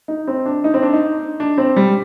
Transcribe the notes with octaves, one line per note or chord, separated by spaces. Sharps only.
D#4
C4
D4
D#4
C4
D4
D#4
D4
C4
G3